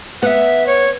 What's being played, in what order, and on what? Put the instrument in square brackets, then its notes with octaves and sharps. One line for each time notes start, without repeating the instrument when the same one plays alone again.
[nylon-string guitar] B3 [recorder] E5 F#5
[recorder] C#5